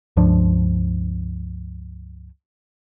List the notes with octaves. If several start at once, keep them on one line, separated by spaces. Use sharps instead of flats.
C#2 G2 F3 D4